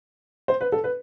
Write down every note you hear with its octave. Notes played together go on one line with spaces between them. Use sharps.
C5
B4
A4
B4